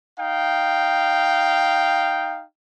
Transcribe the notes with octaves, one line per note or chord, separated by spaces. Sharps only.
D#4 F5 G5